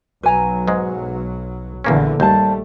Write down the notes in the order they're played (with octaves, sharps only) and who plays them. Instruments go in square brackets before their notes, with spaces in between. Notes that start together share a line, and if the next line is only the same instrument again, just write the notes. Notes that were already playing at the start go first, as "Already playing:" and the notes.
[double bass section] B1 F#3 [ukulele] B4 G#5 A#5
[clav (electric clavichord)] G#2 G#3
[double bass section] A#1 D3 E3 [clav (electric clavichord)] E2 A#3 C#4
[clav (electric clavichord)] D#2 [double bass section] G3 A3 [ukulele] C5 D5 A5